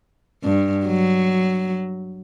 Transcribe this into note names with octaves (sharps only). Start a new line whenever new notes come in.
G2
F#3